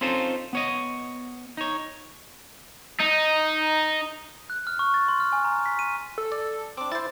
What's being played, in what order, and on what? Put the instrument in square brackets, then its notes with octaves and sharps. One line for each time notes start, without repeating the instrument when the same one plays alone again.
[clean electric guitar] C4 C#4 D#4 F4 A4 C5
B3 C#5 D#5
D#4 C#5
[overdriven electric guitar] D#4
[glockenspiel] F#6
F6
C#6
A6
C6
F6
G#5
A#5
B6
D#7
[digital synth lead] A4
[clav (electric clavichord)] D5
[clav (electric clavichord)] C4 D4 [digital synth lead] D6
[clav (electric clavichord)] E4 C5 [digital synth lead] A6